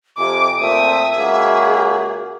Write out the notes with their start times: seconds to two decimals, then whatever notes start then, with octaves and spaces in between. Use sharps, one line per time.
0.18 F2 C3 G#5 D6
0.60 A#2 A3 C4 E5 D#6
1.18 C#2 A#3 F#4 G#4